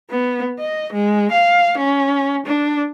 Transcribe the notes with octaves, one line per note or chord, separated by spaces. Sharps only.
B3
D#5
G#3
F5
C#4
D4